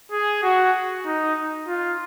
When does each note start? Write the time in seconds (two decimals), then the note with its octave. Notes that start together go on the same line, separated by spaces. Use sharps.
0.12 G#4
0.43 F#4
1.06 D#4
1.67 F4